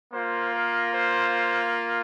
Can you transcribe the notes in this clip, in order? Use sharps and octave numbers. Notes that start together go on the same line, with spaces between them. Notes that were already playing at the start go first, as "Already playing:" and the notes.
A#3 F4 C5
A#4
C5